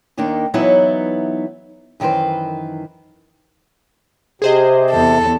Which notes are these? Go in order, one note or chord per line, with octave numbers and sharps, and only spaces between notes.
D#2 D#3 A#3 D4 D#4
E3 F#3 B3 D#4 E4 C#5
F#2 D#3 E3 B4 C5
C3 G#4 C5 D#5
E2 A4